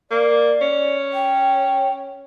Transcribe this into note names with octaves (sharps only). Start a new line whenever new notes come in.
A#3 D5
C#4
G5